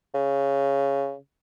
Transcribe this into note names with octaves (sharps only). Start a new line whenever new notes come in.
C#3